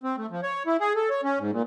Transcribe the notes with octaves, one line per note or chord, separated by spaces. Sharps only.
C4
A3
F3
C#5
E4
G#4
A4
C#5
C#4
G#2
A#2